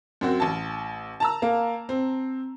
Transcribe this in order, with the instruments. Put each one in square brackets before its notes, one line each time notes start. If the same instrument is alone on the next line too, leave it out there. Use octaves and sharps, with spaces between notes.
[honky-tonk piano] F#2 C4 F#4
A1 A5
A5 A#5 E6
[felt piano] A#3
C4